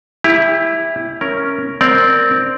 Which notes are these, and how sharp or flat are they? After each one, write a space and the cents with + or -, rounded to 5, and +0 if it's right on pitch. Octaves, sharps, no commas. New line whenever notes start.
E4 +0 G4 +30
C#4 +0 A#4 +0
C4 -5 A#4 +0 D5 +0